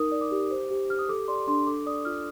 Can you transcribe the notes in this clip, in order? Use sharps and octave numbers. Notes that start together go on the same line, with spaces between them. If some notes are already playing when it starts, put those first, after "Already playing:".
Already playing: D#4 A#4 D#6
D5
D6
G4
C5
G4
G4 F6
D#6
A4 D6
D5 C6
D4 C6
A4 D6
D5 D#6
F4 F6